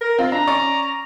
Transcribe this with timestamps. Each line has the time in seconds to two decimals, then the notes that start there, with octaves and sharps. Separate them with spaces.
0.01 A#4
0.19 C4 F4
0.32 D4 A#5
0.47 C#4 D5 C#6